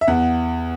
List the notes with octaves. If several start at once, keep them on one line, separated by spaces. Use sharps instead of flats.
E5
E2 F#5